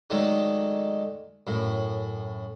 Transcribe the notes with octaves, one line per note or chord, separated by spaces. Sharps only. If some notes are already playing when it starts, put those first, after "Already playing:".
D3 D#3 F#3 G#3 A3 D#4
F#2 A2